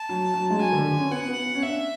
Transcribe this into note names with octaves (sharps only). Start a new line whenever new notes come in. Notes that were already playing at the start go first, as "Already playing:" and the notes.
Already playing: A5
F#3
F#3
G#3
F#3 G#5
D3
D3
C#4
B3 F#5
B3
B3
C#4
D4 E5